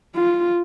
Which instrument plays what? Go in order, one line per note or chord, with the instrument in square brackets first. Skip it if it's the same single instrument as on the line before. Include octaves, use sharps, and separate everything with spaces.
[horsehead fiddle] F4